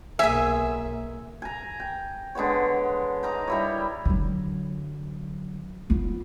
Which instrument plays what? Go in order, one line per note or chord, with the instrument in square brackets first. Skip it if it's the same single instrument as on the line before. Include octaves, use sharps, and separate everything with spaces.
[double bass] B1 A#3 [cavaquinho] G#4 G#5 [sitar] E5
[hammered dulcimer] G#5 A#5
G5
D3 G#3 B3 C#5
D#4 A#4 A#5 D6
G3 E4 C#5
[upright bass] D3 F#3
B3 F4